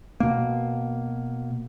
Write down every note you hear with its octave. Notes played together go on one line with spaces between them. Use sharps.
B2 A#3